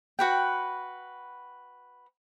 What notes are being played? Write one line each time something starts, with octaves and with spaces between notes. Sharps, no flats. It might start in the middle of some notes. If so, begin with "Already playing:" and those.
F#4 B4 G5